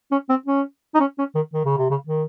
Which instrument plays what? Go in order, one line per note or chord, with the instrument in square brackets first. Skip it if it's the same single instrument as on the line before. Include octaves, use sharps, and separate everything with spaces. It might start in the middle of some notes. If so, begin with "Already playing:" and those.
[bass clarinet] C#4
C4
C#4
D#4
C#4
C#4
D#3
D#3
C#3
C3
C#3
D#3